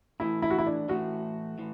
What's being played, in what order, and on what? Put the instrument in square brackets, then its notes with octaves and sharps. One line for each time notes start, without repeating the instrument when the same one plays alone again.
[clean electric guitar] A2 E3 A3 [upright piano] E4
[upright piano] E4
F#4
E4
D4
[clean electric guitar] A2 E3 A3 [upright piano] F#4
[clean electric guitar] A2 E3